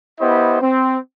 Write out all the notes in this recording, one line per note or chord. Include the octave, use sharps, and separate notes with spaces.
B3 E4 G4 C5 D#5
C4